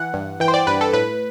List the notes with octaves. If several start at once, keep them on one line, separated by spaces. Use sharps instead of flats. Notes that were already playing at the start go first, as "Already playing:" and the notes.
Already playing: E3 F#5
G2
E3 G5
C5
D5
G2 B4
A4
A2 B4